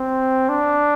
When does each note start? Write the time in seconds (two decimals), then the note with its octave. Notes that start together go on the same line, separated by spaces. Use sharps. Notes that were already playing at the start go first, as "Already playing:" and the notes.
Already playing: C4
0.49 D4